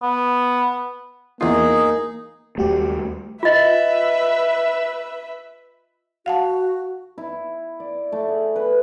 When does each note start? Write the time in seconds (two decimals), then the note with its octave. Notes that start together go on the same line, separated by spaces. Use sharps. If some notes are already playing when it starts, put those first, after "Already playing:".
0.02 B3
1.41 E2 A#3 D#4 F4 G#4
2.58 D#2 G3 A3 F#4 G4
3.43 F4 B4 D#5 E5
6.26 F#4 F5 F#5 A5
7.18 E4
7.80 D5
8.12 A3
8.29 G#4
8.56 B4